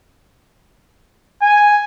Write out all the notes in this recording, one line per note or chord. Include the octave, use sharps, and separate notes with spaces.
G#5